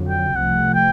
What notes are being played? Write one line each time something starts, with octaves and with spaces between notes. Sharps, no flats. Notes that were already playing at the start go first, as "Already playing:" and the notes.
Already playing: F2 D3 F#3
G5
C2 C3 F3 A3 F#5
G5